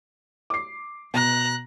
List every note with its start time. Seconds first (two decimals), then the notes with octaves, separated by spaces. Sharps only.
0.50 D6 C7
1.14 B2 A#5 F#6